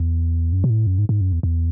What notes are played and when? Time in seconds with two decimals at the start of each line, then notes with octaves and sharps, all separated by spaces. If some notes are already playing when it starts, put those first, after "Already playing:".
Already playing: E2
0.53 F#2
0.64 B2
0.70 A2
0.87 F#2
0.98 G#2
1.09 G#2
1.21 F#2
1.32 E2
1.43 E2